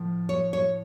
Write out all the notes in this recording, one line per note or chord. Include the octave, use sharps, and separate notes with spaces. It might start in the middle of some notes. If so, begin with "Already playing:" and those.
Already playing: A2 F3
C#5
C#5